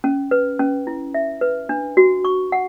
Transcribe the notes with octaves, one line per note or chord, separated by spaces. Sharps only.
C#4
B4
C#4
E4
E5
B4
D4
F#4
C#6
F#5